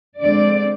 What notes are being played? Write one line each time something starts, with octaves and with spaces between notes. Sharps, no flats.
D3 G#3 C4 D5